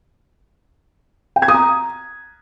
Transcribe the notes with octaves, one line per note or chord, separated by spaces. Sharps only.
G5
G#6
D#6
A#5